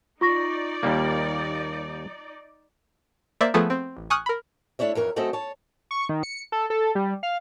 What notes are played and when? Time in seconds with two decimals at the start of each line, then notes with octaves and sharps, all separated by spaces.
0.21 D#4 F4 D5 C#6 A#6
0.83 D#2 G3 A#3
3.41 A#3 C5 D5 E5
3.54 F3 A3 B3 G#4 A4
3.70 C4
3.97 A1
4.10 G#5 C#6 D#6 F6 F#6
4.26 A#4 B5
4.79 A3 D4 E4 C#5 E5
4.95 F2 E3 A#4 C#5
5.16 F#3 A3 C4 C#4 A4 D#5
5.33 C#5 A5
5.91 C#6
6.09 D#3
6.23 C#7
6.52 A4
6.70 A4
6.95 G3
7.23 F5